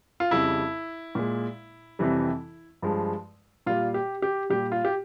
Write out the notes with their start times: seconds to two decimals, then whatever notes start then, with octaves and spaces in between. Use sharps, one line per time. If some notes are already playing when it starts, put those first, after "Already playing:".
0.20 F4
0.31 F2 C#3 G3 E4
1.15 A#2 G#3
1.99 F2 C3 E3 G3
2.82 G2 F3 G#3
3.66 A#2 G3 F4
3.94 G4
4.22 G4
4.50 A#2 G3 G4
4.72 F4
4.85 G4